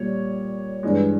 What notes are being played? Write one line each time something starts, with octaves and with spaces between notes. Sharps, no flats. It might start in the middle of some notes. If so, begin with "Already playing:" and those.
Already playing: A#2 G3 C#5
G2 E3 G#3